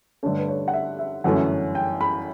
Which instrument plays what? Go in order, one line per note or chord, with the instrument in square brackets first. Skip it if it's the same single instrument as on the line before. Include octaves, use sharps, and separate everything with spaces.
[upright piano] G2 D3 A3 D4 C#5
B4
C#5
F#5
E5
E5
G1 F#2 E3 A3 C#4 F#5
G5
B5